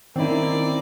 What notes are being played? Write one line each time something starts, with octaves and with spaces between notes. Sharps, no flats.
D#3 A#3 C4 C#4 D#4 E4 D5